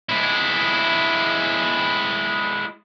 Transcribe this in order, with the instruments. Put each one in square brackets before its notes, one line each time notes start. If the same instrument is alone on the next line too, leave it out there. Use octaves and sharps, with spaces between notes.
[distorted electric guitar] G#3 E4